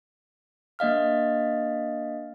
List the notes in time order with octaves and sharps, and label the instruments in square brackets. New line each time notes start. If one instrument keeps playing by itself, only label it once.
[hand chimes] A#3 D4 D#5 F5 F6